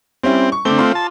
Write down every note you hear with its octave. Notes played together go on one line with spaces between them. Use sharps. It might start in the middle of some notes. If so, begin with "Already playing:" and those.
G3 C4 C#4 E4
C#6
D3 A3 C4 D6 G7
F4 C6
A5